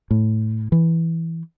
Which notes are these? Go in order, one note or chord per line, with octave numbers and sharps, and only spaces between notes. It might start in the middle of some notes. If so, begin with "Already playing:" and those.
A2
E3